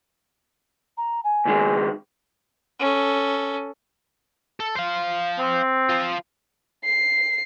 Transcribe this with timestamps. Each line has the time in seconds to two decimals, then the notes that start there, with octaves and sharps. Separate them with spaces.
0.97 A#5
1.24 G#5
1.45 C#2 D#3 G#3
2.79 C#4 A4
4.60 A4
4.76 C5 F5
5.39 C4
5.89 F3 F4
6.85 C7